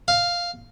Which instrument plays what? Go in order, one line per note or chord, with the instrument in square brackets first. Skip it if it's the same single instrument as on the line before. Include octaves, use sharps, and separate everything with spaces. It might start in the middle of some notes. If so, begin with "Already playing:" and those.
[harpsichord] F5